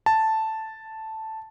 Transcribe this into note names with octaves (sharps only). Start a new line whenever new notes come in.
A5